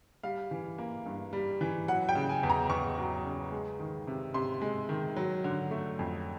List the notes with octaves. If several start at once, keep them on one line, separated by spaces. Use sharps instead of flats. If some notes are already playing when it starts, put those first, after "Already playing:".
G3 F5
E3
A#3
G2
G3
E3
F#3 F#5
G5
C#3
G#5
E2
A#5
E2 C#6
F#3
C#3
G#3
D#3
C3
C3 C6
G#3
D#3
F#3
D3
A3
F2